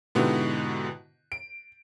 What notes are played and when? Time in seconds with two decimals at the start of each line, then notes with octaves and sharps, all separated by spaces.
0.15 G#2 B2 D3 B3 E4 G4
1.32 D7